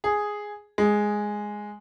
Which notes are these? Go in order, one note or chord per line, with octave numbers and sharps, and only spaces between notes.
G#4
G#3